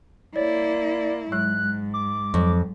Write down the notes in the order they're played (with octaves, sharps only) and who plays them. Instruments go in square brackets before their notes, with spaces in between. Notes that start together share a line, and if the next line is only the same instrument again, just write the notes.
[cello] A#3 E4 [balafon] C#5 [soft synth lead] D5
[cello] G#2 [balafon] F#3 G#3 [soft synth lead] F#6
[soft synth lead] D6
[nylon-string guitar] F2 [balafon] F#3